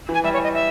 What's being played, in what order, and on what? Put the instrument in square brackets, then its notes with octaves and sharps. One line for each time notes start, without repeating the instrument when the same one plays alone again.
[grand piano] E3
[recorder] G#5
[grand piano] G3 [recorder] E5
[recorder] C#5
D#5
E5